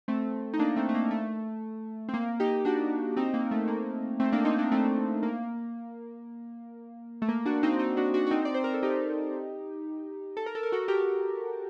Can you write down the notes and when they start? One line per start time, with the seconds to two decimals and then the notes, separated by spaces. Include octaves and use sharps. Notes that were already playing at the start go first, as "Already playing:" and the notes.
0.08 A3 C4
0.54 D#4
0.59 A#3 D4
0.76 A3 C4
0.89 A3
0.94 A#3
1.11 A3
2.09 C4
2.14 A#3
2.40 D#4 G4
2.65 D4 F#4
3.17 C4 D#4
3.34 A#3
3.51 A3
3.68 A#3
4.20 A3 C4
4.32 A#3 D4
4.45 C4 D#4
4.58 A#3 D4
4.72 A3 C4
5.23 A#3
7.22 A3
7.29 A#3
7.46 D4 F#4
7.63 C4 D#4
7.79 C4 D#4
7.97 D4 F#4
8.14 D4 F#4
8.27 F#4
8.31 C4 D#4
8.45 D5
8.54 C5
8.64 A#4
8.74 A4
8.83 D#4 G4
10.37 A4
10.46 A#4
10.55 A4
10.63 A#4
10.72 F#4 A4
10.88 G4 A#4